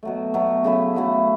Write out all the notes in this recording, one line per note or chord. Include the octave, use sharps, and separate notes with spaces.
B2 F#3 A3
B2 F#3 A3
C#3 F#3 A3 E4
C#3 F#3 A3 E4